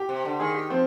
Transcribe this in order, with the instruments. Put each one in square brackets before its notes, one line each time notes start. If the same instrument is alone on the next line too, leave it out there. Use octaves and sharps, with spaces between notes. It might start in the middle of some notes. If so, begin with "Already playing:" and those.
Already playing: [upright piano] G4
[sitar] C3
D3
[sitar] D#3 [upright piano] G#4
[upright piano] G4
[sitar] F3 [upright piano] C4